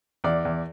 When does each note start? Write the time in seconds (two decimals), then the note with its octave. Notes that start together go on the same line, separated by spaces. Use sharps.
0.24 E2 D5
0.45 E2